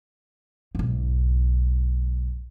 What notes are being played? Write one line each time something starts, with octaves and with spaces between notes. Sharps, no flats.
B1 G#2